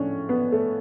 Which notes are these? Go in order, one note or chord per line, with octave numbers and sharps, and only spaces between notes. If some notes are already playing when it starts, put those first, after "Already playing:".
Already playing: A2 F3 C#4 D4
B3
A3